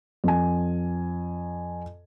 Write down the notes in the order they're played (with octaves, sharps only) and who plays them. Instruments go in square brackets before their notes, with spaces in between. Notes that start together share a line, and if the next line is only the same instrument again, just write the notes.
[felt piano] F2 G#5